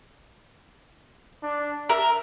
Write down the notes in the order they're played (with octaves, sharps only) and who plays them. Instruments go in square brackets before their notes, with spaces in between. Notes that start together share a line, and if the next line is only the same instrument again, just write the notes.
[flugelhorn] D4
[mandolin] A#4 [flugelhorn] E5